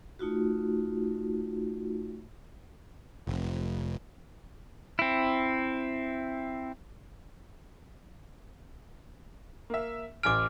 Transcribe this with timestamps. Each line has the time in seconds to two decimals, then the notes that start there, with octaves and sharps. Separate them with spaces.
0.19 A3 D#4 F4 F#4
3.27 F1
4.99 C4 E4
9.70 A#3 E5
10.23 A1 G#5 D6 F6 D7